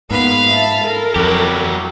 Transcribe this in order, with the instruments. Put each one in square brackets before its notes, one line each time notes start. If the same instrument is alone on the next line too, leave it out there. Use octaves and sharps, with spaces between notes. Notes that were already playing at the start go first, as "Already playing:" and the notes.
[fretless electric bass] G#2 [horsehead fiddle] A#3 B3 [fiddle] F5 B5
[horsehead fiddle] E5 A5
A4 A#4
[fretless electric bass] F2 [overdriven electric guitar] F#3 G4 [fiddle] E4